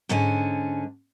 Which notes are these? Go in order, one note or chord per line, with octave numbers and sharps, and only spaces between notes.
G#2 D3 C#4 G#5